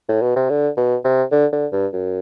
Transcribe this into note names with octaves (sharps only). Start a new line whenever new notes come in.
A2
B2
C3
D3
B2
C3
D3
D3
G2
F#2